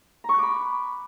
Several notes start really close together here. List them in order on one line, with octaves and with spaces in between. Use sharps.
A#5 C#6 F#6 D6 B5